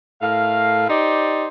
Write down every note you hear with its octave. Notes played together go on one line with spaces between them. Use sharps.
A2 A3 A#4 F5
D#4 G4 C5 D5